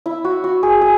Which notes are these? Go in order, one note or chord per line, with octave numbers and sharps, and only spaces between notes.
E4
F#4
F#4
G#4
G#4